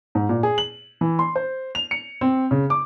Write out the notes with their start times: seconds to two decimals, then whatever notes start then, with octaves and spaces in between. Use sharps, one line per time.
0.15 G#2
0.29 A#2
0.43 G#4
0.58 F#7
1.01 E3
1.19 C6
1.36 C5
1.75 F7
1.91 C#7
2.21 C4
2.51 C#3
2.70 D6